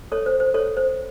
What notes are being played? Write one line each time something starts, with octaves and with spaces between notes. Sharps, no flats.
A4 C#5
C5
C5
A4 C#5
C5